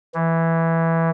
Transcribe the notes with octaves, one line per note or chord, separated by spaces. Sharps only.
E3